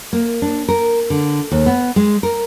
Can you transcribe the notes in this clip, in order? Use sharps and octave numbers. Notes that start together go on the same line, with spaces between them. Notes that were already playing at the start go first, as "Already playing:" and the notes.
A#3
D4
A#4
D3
D#2
B3
G#3
A#4